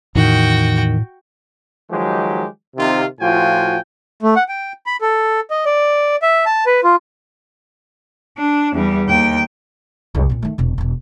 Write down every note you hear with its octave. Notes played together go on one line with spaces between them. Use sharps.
E2 A2 D#3 F#4 G5
D#3 F3 F#3 G#3 G4
C3 D#3 F4
A2 F3 F4 F#4 G5 G#5
A3
F#5
G5
B5
A4
D#5
D5
E5
A5
B4
F4
D4
E2 G3
D#2 G5
C2 F#2
A#2 C4
D#3 A3
E1 B2
E1 B2